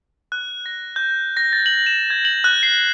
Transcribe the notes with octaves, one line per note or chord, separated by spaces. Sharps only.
F#6
A#6
G6
A#6
A6
F#7
E7
G#6
F#7
F#6
C7